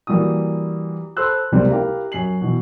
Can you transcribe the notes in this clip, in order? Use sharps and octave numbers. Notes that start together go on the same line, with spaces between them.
E3 G3 A#3 F#4 D#6
A4 C5 B5 C6 E6 F#6
C#2 C3 G3 A#3 C4
E4 G4 A#4 F5 A#5
F#2 G#5 C7 F#7
B2 E3